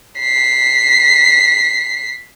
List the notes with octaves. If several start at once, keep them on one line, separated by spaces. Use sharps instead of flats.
B6 C7